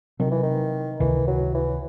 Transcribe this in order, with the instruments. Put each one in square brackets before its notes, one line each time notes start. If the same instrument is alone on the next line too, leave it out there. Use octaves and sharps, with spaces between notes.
[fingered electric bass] C3 F#3 C4 [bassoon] D#3
[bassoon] E3
D#3
[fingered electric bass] C#2 C3 D#3 [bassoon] E3
[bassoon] F#3
E3